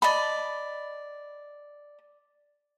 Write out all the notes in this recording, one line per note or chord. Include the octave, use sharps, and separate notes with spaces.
D5 D#5 A5 B5